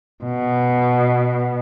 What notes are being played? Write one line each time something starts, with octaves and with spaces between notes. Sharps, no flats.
B2